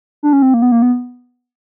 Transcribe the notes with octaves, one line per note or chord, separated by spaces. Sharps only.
D4
C#4
C4
A#3
B3
A#3
B3